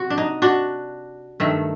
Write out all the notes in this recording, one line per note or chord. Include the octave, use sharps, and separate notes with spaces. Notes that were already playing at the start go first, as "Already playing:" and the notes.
Already playing: C3 C4 F#4
D4
D#4
D4 F#4
G2 D#3 A3